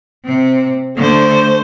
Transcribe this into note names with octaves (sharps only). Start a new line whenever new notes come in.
C3 C4
D3 A3 C5